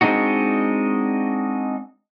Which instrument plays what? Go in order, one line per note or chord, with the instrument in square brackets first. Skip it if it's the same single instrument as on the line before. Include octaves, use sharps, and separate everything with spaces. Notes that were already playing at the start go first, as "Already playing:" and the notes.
[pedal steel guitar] G#3 C4 D4 D#4 F#4